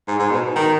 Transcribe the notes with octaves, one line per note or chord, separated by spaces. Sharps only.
G#2
G#2
B2
D#3